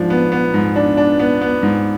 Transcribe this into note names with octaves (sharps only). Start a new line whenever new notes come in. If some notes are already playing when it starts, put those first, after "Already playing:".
Already playing: G#2 F3 D4
B3
B3
G#2
D4
D4
B3
B3
G#2